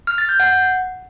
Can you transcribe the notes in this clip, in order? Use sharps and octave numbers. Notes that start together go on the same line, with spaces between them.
F6
A6
G6
F#5